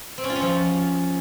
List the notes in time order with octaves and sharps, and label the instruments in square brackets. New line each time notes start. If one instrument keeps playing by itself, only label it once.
[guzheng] C4
C#4
F4
C#4
F3